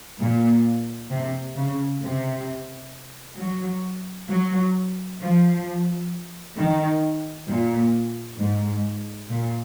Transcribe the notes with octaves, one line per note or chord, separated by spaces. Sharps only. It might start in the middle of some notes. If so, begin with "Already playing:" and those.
A#2
C3
C#3
C3
F#3
F#3
F3
D#3
A#2
G#2
A#2